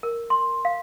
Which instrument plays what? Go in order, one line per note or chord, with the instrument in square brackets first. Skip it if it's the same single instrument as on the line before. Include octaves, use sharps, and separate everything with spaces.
[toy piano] A#4
C6
F5